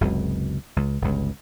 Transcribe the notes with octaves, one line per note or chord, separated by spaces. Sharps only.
F#1 C#2 F#2 C3
C#2
G1 C#2